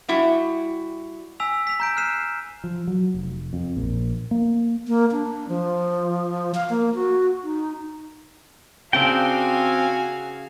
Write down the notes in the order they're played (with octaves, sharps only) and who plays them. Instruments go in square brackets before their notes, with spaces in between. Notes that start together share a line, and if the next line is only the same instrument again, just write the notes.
[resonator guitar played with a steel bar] G3 E4 F#4
[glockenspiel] G#5 E6 B6 F7
B6 F7
A#5 G6 D7
F6 F#6 B6 C7 D#7 E7
[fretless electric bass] F3
F#3
F1
F2
A#1
A#3
[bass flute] A#3
D4
F3
F5
A#3
F#4
D#4
[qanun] C#3 D4 [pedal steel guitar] C4 G5 [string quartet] F#4 F5 G#5